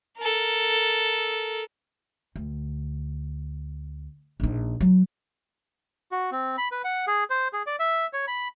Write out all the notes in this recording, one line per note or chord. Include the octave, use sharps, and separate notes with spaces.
A4 A#4
D2
A#1 D#4
F#3
F#4
C4
B5
B4
F#5
G#4
C5
G#4
D5
E5
C#5
B5